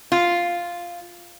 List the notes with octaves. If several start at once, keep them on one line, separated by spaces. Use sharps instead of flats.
F4